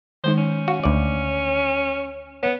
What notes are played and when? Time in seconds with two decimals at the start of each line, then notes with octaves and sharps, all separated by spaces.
0.24 D#3 G#3 D#4 C5
0.38 C#4
0.68 F#4 F5
0.84 D2 D5
2.43 B3 C#5